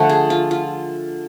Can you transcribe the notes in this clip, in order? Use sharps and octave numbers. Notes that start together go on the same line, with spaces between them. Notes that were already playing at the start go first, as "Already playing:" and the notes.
Already playing: D3 F3 A3 F#5
G#4
F4
F4